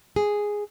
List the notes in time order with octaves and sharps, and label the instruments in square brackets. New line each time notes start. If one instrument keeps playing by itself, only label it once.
[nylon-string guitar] G#4